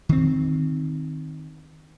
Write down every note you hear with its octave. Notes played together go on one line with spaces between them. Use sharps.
D#3 C4